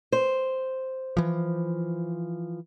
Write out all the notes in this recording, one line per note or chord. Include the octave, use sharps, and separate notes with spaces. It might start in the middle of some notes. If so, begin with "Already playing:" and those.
C5
E3 F3